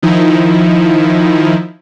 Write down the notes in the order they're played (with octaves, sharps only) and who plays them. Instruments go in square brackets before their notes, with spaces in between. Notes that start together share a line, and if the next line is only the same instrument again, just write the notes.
[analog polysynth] D#3 F3 D#4 E4